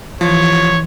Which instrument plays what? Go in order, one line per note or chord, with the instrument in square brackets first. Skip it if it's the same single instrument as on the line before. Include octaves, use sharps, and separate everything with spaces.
[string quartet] E3 [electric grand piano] F3 [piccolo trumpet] C#5